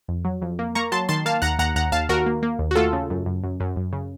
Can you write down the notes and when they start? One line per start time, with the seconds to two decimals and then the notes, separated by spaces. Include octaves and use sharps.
0.08 F2
0.25 F#3
0.42 F2
0.59 A#3
0.75 A#3 A#5 C#6
0.92 F#3 A5 C6
1.09 D#3 A5 C6
1.26 A#3 F5 A5
1.42 D#2 F#5 A#5
1.59 D#2 F#5 A#5
1.75 D#2 F#5 A#5
1.92 D#2 F5 A5
2.09 D#2 F#4 A#4
2.26 A#3
2.43 A#3
2.59 D#2
2.71 F#4
2.75 A3 F4 A4
2.93 C#3
3.10 F#2
3.26 F#2
3.44 F#2
3.60 F#2
3.76 F#2
3.93 C#3